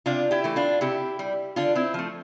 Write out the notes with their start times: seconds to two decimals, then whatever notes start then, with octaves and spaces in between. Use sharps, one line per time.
0.06 C3 D4 F4
0.31 E4 G4
0.44 E3 A3
0.56 D4 F4
0.81 C3 E4 G4
1.19 G3
1.56 D3 D4 F4
1.75 C4 E4
1.94 F3 A3